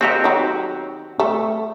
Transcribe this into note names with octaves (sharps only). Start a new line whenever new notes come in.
D#3 F#3 A#3 C4 F#4 G4
D#3 F#3
A3